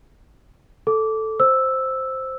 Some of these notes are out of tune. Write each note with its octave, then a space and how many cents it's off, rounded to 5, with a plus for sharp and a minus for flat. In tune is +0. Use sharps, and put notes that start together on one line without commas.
A4 +0 D6 -15
C5 +0 E6 +0